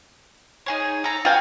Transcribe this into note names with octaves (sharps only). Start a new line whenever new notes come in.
D#4 G#4 C#5
A4 A#5
F4 F#4 F5 G5 G#5